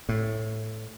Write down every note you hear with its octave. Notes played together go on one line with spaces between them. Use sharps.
A2